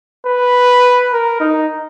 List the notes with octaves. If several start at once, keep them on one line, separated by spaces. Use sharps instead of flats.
B4
A#4
D#4